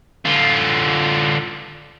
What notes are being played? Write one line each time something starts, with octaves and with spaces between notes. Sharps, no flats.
D3 F4